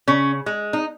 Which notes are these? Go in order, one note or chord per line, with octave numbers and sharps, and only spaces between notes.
C#3 C#4
G#3
D#4